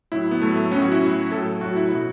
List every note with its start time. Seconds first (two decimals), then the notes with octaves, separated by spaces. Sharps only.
0.12 A2 F#3 E4
0.31 B3
0.42 A2 F#3 A3
0.56 A3
0.71 A2 F#3 C#4
0.82 F#4
0.92 E4
1.02 A2 F#3
1.31 A2 F#3 A4
1.61 A2 F#3 F#4
1.76 E4
1.91 B2 F#3 F#4